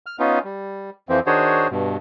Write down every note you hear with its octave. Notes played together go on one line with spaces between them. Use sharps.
F6
B3 C#4 D#4 F4
G3
F2 E3 F3 C4
D#3 D4 F#4 G#4 C5 C#5
G2 B2